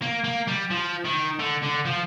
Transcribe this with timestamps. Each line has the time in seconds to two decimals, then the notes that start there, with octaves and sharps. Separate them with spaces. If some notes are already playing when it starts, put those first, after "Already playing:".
0.02 A#3
0.24 A#3
0.48 G3
0.71 F3
1.05 D#3
1.40 D3
1.63 D3
1.85 F3